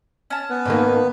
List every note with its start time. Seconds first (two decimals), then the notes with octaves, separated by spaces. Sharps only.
0.30 C#4 A5
0.50 B3 B4
0.65 G#2 D#3 A#3